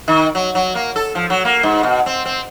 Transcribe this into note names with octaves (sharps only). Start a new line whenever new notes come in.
D#3
F#3
F#3
A#3
A4
F3
F#3
A#3
G#2
B2
C4
C4